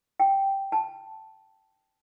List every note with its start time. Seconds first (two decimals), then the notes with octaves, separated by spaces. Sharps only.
0.20 G5
0.72 A5